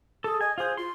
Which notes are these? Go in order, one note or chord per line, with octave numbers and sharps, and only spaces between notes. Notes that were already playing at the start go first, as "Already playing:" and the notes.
G#4 A4
D#5 G#5
F4 G#4 C5
F4 C6